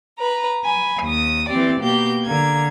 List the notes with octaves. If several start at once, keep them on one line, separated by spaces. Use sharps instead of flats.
B4 A#5
G#5 B5
D#2 D#6
E3 C4 G4 D5
B2 A#3 G4 G6
D3 A#3 G#6